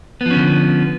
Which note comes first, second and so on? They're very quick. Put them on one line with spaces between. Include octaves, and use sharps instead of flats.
B3 F3 C#4 D3